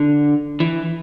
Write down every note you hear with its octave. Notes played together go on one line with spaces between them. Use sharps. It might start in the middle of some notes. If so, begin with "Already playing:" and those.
Already playing: D3
E3